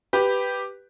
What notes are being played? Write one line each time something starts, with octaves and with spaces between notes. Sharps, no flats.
G4 B4